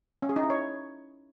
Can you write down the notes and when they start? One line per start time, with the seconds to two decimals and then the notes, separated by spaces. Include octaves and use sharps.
0.22 C#4
0.29 G#4
0.36 D#4
0.43 E4
0.50 C#5